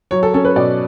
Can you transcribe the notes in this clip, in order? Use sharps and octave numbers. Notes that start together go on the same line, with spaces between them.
F#3 C#5
A4
C#4 A4
B4
B2 D5